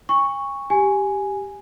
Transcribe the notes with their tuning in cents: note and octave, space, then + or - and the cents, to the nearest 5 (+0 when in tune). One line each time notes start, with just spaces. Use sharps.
G#5 -40 C#6 +0
G4 +0 G#5 +0